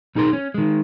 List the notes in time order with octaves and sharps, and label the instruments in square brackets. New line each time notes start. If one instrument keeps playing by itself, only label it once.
[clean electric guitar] B1 D#4 G#4 A#4 C6
C#4
D#3 G#3